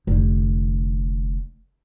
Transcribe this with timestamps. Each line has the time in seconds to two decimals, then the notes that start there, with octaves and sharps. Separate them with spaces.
0.07 F1 D3